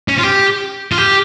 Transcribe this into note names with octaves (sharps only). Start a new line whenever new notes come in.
C#4
F4
G4
F4
G4